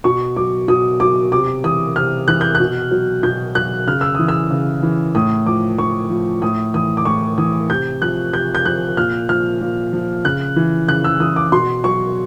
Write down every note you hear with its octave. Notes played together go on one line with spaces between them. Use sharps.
B2 C#6
F#3 D6
B2 D#6
F#3 D6
C3 D6
E3 D#6
C3 F6
E3 F#6
G6
F#6
B2
F#3
B2 G6
F#3 F#6
C#3 F6
E6
E3 D#6
E6
C#3
E3
A2 D#6
F3 D6
A2 C#6
F3
A2 D#6
E3 D#6
D6
A2 C#6
E3 D#6
C3 G6
F3 F#6
C3 G6
G6
F3 F#6
A#2 F6
F3 F6
A#2
F3
C#3 F#6
E3
C#3 F#6
E6
E3 D#6
D6
B2 C6
F#3 C#6